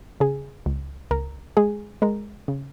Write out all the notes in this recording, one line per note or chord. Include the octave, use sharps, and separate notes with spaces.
C#3 G#4
C#2
C#2 A#4
G#3 G#4
G#3 A#4
C#3